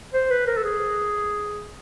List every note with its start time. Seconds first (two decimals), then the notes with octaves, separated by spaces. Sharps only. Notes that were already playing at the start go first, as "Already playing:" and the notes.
0.14 C5
0.31 B4
0.47 A#4
0.57 A4
0.64 G#4